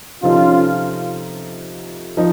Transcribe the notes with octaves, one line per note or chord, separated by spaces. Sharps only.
C3 F3 C4 C#4 D#4 F4 A4
F3 D#4